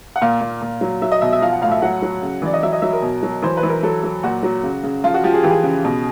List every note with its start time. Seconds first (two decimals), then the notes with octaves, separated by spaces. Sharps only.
0.16 F#5
0.22 A#2 F5
0.41 A#2
0.62 A#2
0.81 F#3
1.02 F#3 E5
1.12 D#5
1.21 B2 E5
1.32 E5
1.41 F3 F5
1.52 F#5
1.62 A2 F5
1.71 E5
1.82 F#3 F#5
2.02 F#3
2.22 C#3
2.42 E3 D5
2.53 D#5
2.63 F#3 E5
2.73 D#5
2.82 F#3 E5
2.93 A#4
3.02 B2
3.23 F#3
3.42 E3 C5
3.57 B4
3.63 E3
3.69 A#4
3.83 F#3 A4
4.04 F#3
4.23 A#2 F#4
4.43 F#3
4.63 C#3
4.83 C#3
5.04 F3 F4
5.14 F#4
5.24 F3 G4
5.34 G#4
5.43 E3 G4
5.50 G#4
5.63 C#3
5.85 B2